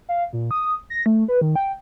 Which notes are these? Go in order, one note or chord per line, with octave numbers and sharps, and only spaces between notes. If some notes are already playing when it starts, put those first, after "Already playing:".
F5
A#2
D#6
A#6
A3
B4
D#3
G5